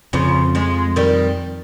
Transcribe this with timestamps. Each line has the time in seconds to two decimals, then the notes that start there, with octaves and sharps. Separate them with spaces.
0.13 F2 C#3 F3
0.55 F3 G#3
0.96 D#3 G3